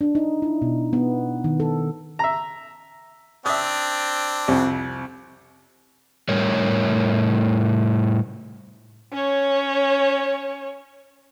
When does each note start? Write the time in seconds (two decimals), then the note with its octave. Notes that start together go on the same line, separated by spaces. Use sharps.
0.01 D4
0.15 D#4
0.42 E4
0.62 B2
0.93 B3
1.44 D#3
1.60 A4
2.19 E5 A#5
3.46 C4 D4 E5 D#6
4.48 C2 F2
6.29 A2 G3 A#4 C#5
9.12 C#4 C#5